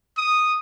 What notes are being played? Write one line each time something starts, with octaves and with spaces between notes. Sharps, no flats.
D#6